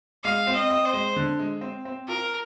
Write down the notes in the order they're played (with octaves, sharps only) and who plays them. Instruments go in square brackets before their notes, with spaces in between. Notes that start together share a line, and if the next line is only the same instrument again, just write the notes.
[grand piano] G#3 [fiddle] F5
[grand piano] C4
[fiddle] D#5
[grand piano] C4
[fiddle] C5
[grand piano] G#3
D3
G#3
C4
C4
[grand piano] F4 [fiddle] A#4